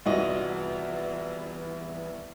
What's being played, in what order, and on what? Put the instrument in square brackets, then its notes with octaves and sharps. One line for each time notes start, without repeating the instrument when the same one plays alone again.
[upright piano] C2 [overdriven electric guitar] E3 B3 [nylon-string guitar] F4 F#4 D#5